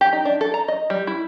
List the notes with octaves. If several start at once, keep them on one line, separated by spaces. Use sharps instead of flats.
G4
D#4
D4
A4
A#5
D#5
G3
E4